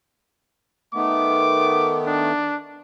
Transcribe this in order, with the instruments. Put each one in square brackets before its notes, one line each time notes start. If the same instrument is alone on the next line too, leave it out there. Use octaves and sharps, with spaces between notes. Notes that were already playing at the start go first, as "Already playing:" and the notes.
[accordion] D#3 A3 B3 [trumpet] D6
[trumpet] D4